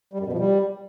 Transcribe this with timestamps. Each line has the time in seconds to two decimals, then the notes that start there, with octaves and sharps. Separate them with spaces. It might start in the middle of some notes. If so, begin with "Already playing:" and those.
0.13 G3
0.20 F#2
0.26 B2
0.33 F3
0.39 G3